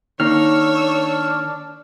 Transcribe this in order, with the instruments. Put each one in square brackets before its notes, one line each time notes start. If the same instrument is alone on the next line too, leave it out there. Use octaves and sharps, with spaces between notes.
[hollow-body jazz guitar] D#3 A#3 [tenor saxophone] D4 [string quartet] C#5 E6 [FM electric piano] F6